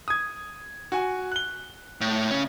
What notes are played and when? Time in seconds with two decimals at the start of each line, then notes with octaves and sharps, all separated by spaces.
0.08 D#6 G#6
0.92 F#4 G#5
1.32 F#6 G7
2.01 A2
2.31 C#3 C#4